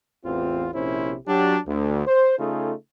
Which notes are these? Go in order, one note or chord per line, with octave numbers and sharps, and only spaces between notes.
A1 E2 C4 F4
A#1 C3 C#4 E4 C5
F#3 D4 G4
D2
C5
C#3 A3 D#4 F4 G#4 A4